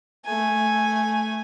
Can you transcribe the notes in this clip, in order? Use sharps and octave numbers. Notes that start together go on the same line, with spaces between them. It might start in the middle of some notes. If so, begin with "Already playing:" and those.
A3 G#5